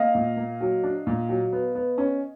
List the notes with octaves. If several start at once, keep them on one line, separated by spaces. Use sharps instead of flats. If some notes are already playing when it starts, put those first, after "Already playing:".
Already playing: A#3 D#5 F5
A#2
A#3
F#3
D4
A#2
F#3
B3
B3
C#4